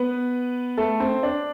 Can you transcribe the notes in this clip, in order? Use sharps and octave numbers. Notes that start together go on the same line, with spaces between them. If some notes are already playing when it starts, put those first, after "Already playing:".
Already playing: B3 B4
A3 A4
C4
D4